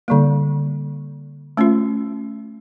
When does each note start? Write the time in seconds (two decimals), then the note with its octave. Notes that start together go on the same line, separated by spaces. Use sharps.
0.08 D3 G3 A#3
1.57 A3 C#4 F4